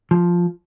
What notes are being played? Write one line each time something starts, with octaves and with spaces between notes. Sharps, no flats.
F3